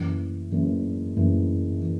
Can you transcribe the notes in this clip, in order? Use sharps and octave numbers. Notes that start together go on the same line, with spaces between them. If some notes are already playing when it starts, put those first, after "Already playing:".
Already playing: F#1 F#2 E3
F#1 F#2 E3
F#1 F#2 E3
E3